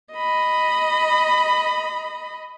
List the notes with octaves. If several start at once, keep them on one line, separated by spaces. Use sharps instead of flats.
D#5 B5